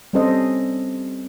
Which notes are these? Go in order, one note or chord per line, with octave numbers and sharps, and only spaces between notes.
G3 C4 C#4 A4 C5 D#5